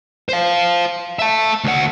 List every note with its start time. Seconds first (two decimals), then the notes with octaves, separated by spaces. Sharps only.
0.29 C5 F5
1.19 E5 A5
1.64 D2 F#5